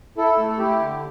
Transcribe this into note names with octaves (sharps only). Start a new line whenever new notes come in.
E4 A4
A3
A4
E4 G4
D3